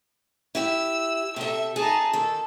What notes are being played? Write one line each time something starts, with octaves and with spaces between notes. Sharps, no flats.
E4 G4 E5 E6
C3 A4 E5
D#4 G#4 A5
D#3 A4